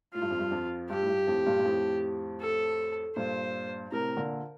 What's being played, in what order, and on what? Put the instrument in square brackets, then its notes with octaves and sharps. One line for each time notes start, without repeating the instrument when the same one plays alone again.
[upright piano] A2 [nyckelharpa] F4
[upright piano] G2
F2
G2
F2
[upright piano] G2 [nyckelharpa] G4
[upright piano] A2
G2
F2 A2
G2 A#2
A#2
F2 A2
[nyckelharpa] A4
[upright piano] G2 A#2 [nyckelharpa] C5
[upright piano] A2 C3 [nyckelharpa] A#4
[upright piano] A#2 D3